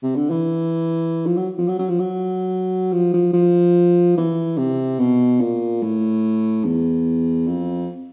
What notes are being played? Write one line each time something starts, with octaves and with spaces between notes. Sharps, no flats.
C3
D3
E3
F3
F#3
F3
F#3
F#3
F3
F#3
F3
F3
F3
E3
C3
B2
A#2
A2
E2
F2